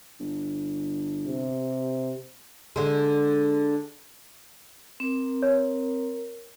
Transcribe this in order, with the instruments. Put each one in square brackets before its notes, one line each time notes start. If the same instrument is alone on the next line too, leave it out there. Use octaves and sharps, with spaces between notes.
[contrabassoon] G1
[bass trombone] C3
[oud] D3 G#3
[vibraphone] C4 [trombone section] A#4
[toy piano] C#5